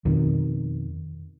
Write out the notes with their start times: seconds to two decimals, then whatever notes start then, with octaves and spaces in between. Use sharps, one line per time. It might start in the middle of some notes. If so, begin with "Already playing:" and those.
0.05 F2 B2 D#3